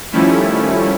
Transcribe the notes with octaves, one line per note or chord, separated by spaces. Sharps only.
D#3 F3 G3 A3 C#4 E4